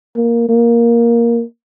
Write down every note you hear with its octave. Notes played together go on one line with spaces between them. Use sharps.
A#3
A#3